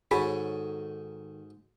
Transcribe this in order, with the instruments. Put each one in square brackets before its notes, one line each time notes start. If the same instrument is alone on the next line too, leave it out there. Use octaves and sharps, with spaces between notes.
[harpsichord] G#2 F#4 G#5 [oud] D#3 A4 C#5 [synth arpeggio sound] G#4 B5